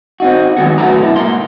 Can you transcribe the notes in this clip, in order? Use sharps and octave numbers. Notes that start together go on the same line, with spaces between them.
C4 D#4 F#4
D#3 F3 F#3 G#3 B3 F#4
F#2 A3 F#4 B4 A#5
B2 E4
G#2 A#3 A#5 C6